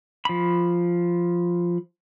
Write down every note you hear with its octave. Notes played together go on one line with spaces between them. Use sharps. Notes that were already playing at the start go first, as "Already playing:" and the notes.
F3 B5